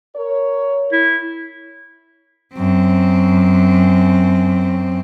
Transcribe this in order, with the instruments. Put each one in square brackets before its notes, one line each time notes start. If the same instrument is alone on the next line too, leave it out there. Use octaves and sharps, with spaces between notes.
[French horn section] A#4 C#5
[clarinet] E4
[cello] F#2 C4